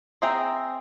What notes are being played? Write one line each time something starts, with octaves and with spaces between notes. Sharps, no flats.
C4 G#4 E5 G5 A#5